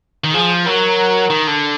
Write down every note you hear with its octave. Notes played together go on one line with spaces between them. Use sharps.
D#3
F3 G#4
F#3 A#4
D#3
D3